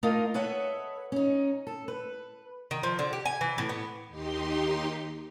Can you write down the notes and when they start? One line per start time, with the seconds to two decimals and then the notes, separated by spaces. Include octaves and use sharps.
0.03 A3 A#3 D#4 F4 A#4 D#5
0.34 A4 B4 C#5 D#5 E5 F#5
1.12 C#4 D#4
1.67 A4
1.88 B4
2.71 D#3
2.83 F3
2.99 D3
3.13 G4
3.26 G#5
3.41 E3
3.58 A2
3.69 B3
4.08 D#2 D#4 G4 C6